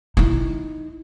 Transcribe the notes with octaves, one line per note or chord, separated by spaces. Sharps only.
D#4 E4